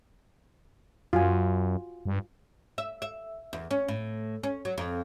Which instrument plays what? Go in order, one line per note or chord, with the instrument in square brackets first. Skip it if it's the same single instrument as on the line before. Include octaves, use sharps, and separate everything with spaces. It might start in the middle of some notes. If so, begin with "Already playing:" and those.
[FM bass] F#2 [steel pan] F4 F#4 G#5
[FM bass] G2
[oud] E5
E5
E2
C#4
A2
C#4
F#3
F2